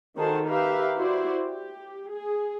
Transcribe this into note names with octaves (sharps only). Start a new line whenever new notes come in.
D#3 F#4 G#4 A4 C5 A5
G4 A#4 B4 E5 F5
E4 F#4 C5 D5
G4
G#4